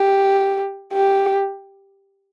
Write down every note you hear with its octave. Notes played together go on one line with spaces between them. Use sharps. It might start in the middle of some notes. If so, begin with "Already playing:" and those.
Already playing: G4
G4